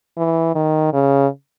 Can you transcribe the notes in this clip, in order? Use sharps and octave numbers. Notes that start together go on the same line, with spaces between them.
E3
D#3
C#3